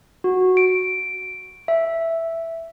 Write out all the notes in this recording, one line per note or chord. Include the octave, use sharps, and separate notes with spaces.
F#4
D7
E5